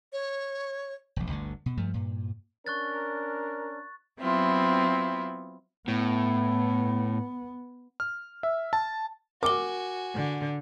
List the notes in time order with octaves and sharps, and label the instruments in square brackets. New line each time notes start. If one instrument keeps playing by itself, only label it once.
[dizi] C#5
[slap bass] E1 A#1
G1 D2 D3
B2
G2 F3 A3
G2 A#2
[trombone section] C#4 D4 A#4 [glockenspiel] C#6 F#6 A6
[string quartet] F#3 B3 C4 E4 F4
[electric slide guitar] A2 [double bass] B3
[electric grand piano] F6
E5
A5
[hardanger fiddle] F#4 G#5 [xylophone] A#4 G7 [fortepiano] D6
[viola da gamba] D3